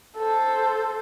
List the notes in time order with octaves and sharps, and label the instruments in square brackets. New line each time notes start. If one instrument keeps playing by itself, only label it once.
[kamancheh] A4 C5